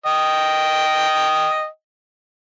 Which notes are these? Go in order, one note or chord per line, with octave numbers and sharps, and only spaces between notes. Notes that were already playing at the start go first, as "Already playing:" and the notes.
D#5 G5